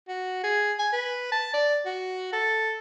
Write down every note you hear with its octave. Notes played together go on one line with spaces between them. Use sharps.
F#4
G#4
G#5
B4
A5
D5
F#4
A4